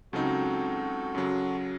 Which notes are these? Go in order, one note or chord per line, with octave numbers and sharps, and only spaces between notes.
C#2 C#3 F#3 C4 D#4 F#4 A4
F#2 C#3 F#3